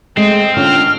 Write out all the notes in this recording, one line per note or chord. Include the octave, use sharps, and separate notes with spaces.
G#3 A3 C4 D#5
D3 C#4 F4 F6